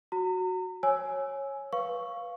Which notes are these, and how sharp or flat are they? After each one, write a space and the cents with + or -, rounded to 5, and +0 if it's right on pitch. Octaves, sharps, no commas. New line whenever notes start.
F#4 +0 A#5 -35
C#5 -15 G#5 +10 E6 +0
B4 -15 F5 +0 C#6 +0